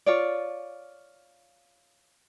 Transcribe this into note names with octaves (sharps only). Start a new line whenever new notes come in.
F4 C#5 D5